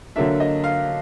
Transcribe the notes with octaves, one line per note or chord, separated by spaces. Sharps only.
D3 F#3 A#3 D4 E5
D#5
F5